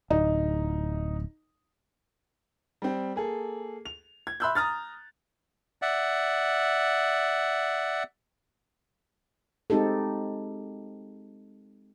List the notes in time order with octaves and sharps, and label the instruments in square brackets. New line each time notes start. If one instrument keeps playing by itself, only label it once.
[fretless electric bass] D1 [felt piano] D#4
[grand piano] G3 C4
A#3 G#4 A4
F7
G#6
E5 B5 C6 E6 F#6 G6
A#5 D#6 F6 A6
[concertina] D5 E5 F#5
[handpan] G#3 C4 D#4 G4 A4